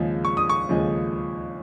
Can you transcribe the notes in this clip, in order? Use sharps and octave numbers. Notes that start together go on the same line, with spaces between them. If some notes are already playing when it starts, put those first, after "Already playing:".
Already playing: D#2 C#3 F3 G#3
C#6
D#6
C#6
D#2 C#3 F3 G#3